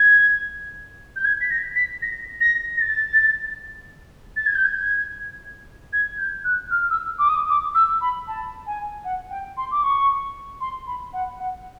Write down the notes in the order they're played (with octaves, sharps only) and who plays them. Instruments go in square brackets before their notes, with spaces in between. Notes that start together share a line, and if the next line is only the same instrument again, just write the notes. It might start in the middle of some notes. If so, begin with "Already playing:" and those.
Already playing: [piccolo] G#6
G6
G#6
B6
A#6
B6
A#6
A#6
A#6
A6
A6
G#6
G6
G#6
G#6
G6
F#6
F6
E6
D6
D#6
D6
E6
B5
A5
G#5
F#5
G5
C6
D6
C#6
C6
B5
F#5
F#5